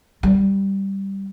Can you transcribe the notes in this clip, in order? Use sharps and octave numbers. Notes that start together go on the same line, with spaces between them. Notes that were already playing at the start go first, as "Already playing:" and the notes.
G3